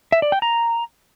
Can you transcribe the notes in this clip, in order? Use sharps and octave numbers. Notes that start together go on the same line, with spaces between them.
E5
D5
G5
A#5